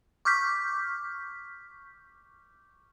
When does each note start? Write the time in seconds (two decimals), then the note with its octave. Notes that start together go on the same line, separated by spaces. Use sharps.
0.25 C#6 D6 F6 G6 B6